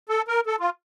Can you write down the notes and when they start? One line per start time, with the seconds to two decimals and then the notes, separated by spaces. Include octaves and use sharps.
0.09 A4
0.28 A#4
0.46 A4
0.60 F4